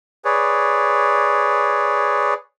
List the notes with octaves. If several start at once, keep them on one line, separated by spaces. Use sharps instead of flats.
G#4 B4 C#5 D5